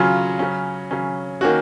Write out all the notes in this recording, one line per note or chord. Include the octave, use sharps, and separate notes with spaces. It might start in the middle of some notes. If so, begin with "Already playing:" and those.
Already playing: C#3 F#3 C#4 F4
C#3 F#3 C#4
C#3 F#3 C#4
D#3 A#3 C#4 F#4